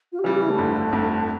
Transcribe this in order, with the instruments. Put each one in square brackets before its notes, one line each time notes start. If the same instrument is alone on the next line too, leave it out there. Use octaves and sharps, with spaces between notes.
[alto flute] F4
G4
[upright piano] C#3 E3 G3 [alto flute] F4
[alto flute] G4
E4
A3
[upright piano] G1 F2 D3
G1 F2 D3